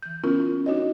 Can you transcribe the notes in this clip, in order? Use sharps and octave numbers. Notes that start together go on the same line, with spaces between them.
E3 G6
B3 C#4 E4 F4 A#4
D4 D#4 F#4 C#5 D#5